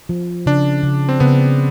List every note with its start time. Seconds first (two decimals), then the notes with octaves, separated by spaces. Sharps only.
0.09 F3
0.46 C#3 D4
0.83 C#3
1.09 C4
1.20 C#3 B3